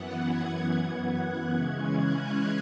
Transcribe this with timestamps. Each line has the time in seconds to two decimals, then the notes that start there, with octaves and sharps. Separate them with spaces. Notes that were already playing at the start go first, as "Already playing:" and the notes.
Already playing: F#2 E3 B3 F#5
0.23 G#6
1.11 F#6
1.54 C#3 E3 G#3 C#4 G#6
1.99 F#6